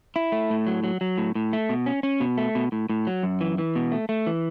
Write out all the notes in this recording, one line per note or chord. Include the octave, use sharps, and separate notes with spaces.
E4
A3
A2
F#3
F#3
F#3
A2
A2
A3
B2
C#4
C#4
B2
A3
B2
A2
A2
F#3
F#2
E3
E3
B2
A3
A3
E3